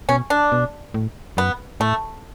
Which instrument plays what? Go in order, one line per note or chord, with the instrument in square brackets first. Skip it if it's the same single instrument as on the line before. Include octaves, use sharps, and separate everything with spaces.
[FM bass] B2 [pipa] C#4
[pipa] D4
[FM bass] B2
A2
[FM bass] F#2 [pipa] B3
[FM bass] A2 [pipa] A3